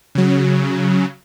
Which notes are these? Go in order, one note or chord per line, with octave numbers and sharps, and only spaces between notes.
C#3 F#3